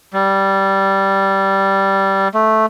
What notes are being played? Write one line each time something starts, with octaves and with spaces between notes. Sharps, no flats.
G3
A3